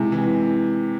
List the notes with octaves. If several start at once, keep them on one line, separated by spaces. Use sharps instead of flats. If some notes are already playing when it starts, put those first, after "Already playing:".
Already playing: C3 G#3 E4 G#4
E3